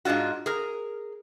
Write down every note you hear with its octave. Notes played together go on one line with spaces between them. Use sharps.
G#2 G#3 D4 F4 F#4
G#4 A#4